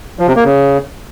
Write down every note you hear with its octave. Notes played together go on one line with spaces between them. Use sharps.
F3
C3
A#3
C#3